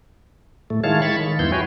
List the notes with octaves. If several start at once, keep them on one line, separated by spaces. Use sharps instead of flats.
A2 A3
D#3 G#3 E4 C#5 F5 A5
B5 C#6 A6
D#3
E2 G2 B3 E4 C6 G6
F#4 B4 C#5 G5 G#5